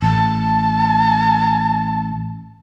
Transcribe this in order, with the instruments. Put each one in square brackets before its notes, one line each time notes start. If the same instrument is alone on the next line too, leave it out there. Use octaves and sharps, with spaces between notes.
[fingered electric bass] A1 [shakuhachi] A5